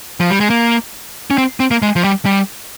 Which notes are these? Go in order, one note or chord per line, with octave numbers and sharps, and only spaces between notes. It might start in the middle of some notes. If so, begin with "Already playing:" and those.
F3
G3
G#3
A#3
C#4
C4
C4
A#3
G#3
F3
G3
G3